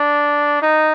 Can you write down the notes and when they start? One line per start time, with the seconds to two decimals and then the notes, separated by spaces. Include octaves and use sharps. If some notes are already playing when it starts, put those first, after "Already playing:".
Already playing: D4
0.62 D#4